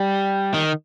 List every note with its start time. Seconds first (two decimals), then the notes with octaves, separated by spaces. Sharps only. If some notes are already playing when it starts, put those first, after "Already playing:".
Already playing: G3
0.54 D#3